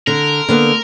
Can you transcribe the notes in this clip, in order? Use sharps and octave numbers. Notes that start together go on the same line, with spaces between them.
D3 A#4
D3 A#3 B3